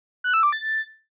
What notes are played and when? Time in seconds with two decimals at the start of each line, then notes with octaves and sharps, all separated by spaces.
0.24 F#6
0.34 E6
0.43 D6
0.52 A6